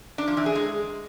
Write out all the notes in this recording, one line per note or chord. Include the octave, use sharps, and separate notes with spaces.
D4
F3
E3
G#4
G#3